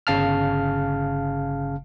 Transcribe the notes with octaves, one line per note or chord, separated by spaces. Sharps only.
G1 C#3 F5 A5 F6